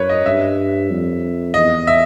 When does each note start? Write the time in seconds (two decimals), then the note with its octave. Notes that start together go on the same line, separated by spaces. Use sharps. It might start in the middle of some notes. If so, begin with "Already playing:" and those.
Already playing: F#2 A#4 B4 C#5
0.09 D#5
0.26 G2 E5
0.90 F2
1.54 E2 D#5
1.87 E5